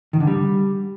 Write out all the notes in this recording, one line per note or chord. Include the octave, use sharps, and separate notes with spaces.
D#3
D3
G3